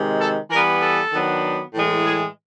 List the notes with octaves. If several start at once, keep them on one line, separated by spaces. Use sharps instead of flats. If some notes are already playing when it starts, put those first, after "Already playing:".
Already playing: C3 D#3 G#3
A4
E3 G3 B3 A#4
A4
D#3 F#3 B3 D4
A2 E3 G#3
G#4